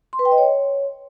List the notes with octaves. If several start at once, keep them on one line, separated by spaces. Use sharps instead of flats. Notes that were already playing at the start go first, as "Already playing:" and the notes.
C6
B4
G5
D#5
C#5